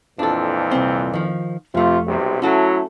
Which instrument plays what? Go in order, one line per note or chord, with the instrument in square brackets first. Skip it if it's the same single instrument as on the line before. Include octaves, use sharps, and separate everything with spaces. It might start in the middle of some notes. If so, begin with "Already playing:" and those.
[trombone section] F2 A#2 E3 [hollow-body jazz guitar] D4 A4
[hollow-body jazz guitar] C2 C4
D#3 F3
[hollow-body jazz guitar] F2 A3 [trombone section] C3 F4
[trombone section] B1 C3 G3
[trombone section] F#3 A3 E4 [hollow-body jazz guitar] C#4 F#4 A4